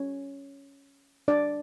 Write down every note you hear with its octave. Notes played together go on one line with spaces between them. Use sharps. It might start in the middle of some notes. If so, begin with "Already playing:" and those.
Already playing: C#4 C#5
D4 D5